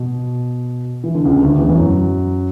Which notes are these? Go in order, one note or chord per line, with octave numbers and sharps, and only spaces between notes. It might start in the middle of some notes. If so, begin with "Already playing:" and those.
Already playing: B2
E3
D3
C#2 C#3
D2 D3
E2 E3
E3
F#2 F#3